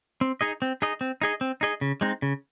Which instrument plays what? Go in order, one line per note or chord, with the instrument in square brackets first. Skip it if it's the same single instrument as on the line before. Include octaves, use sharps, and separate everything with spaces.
[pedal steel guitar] C4
D#4 G#4 D#5
C4
D#4 G#4 D#5
C4
D#4 G#4 D#5
C4
D#4 G#4 D#5
C#3
G#3 C4 D#4
C#3